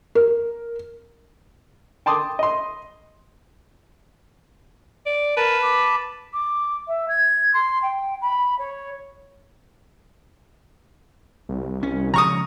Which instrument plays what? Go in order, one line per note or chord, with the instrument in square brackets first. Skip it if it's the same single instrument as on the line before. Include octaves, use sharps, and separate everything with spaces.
[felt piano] A#4
[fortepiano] G5 A5 C6 D6 D#6
D#5 C6
[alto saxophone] D5
[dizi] A#4 [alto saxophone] B4 [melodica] A5 B5
[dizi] D6
[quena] D6
E5
G#6
C6
G5
B5
C#5
[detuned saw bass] C2
[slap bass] C#4
[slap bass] C#3 F3 G#3 [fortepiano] A#5 C#6 D#6